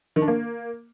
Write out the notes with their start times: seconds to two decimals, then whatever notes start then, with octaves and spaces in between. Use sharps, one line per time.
0.16 D#3
0.22 D4
0.28 A#3